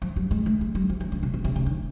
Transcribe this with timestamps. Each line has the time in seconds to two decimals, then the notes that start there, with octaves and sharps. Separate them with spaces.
0.02 F3
0.16 G3
0.31 G#3
0.46 A3
0.61 G#3
0.75 G3
0.89 F3
1.00 E3
1.12 D3
1.23 B2
1.34 B2
1.44 C3
1.56 C#3
1.66 D#3